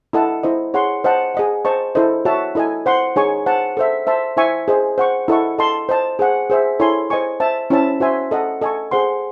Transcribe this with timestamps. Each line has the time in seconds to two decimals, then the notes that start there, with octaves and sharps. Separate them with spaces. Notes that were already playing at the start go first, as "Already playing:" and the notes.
0.13 E4 A4 D#5 F#5 A5
0.43 E4 C5 D#5
0.74 G#4 C#5 F#5 C6
1.04 C5 D#5 F#5 A5
1.35 G#4 D#5 F#5
1.65 C5 D#5 A5 C#6
1.95 E4 A4 C5 D#5
2.25 F#4 C#5 E5 A5
2.55 E4 A4 D#5 G#5
2.86 C5 F#5 C6
3.16 D#4 G#4 C#5 G#5 C#6
3.46 C5 F#5 A5
3.77 A4 C5 E5
4.07 C5 E5 A5 C6
4.37 E4 C5 E5 G#5 C#6
4.68 G#4 C5 D#5
4.98 C5 F#5 C#6
5.28 E4 A4 D#5 F#5 C#6
5.58 A4 D#5 A5 C6
5.89 C5 D#5 A5
6.19 G#4 C5 F#5
6.50 G#4 C5 E5
6.80 E4 A4 C#5 G#5 C6
7.10 C5 D#5 G#5 C#6
7.40 C5 E5 A5
7.70 C#4 E4 C5 E5 A5
8.00 F#4 C5 E5 G#5 C6
8.31 A4 D#5 F#5
8.62 A4 D#5 G#5 C#6
8.91 G#4 C5 F#5 C6